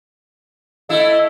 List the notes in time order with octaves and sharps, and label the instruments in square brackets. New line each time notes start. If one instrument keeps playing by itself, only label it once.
[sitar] A3 E4 [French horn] D#5